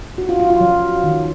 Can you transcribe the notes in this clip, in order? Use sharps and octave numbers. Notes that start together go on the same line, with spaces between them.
F#4
F4
F4
F4
F#3
D#3